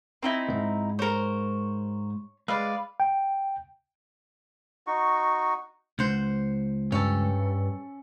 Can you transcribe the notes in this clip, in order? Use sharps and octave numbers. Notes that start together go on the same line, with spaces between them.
C4 D#4 E4
D#2 G#2
A#4 C5 C#5
G#3 B4 D5 F5
G5
D#4 F#4 C#6
C#2 C5 F#5
G2 C#4 A4